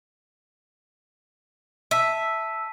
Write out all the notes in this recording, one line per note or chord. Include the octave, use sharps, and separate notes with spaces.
E5 A5 E6 B6 D#7